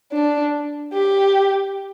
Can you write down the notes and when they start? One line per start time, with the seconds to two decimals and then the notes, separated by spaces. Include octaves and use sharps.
0.12 D4
0.94 G4